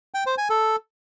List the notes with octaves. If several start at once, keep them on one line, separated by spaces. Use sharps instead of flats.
G5
C5
G#5
A4